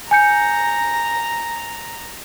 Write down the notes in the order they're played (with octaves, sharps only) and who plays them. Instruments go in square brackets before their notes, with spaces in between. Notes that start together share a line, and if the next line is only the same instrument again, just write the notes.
[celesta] G#5 G6 C#7 [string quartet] A#5